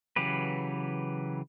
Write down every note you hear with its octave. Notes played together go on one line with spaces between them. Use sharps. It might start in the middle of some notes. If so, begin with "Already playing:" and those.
C#3 E3 F#3 G4 B4